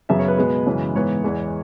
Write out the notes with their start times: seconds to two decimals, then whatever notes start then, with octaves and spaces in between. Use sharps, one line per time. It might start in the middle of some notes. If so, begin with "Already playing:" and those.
0.09 F#2 C#3 F#3 B3 E5
0.19 C#5
0.28 B4
0.38 B2 G#3 B3
0.66 F#2 C#3 E3 G#3
0.95 G#2 E3 B3 C#5
1.24 E2 E3 G#3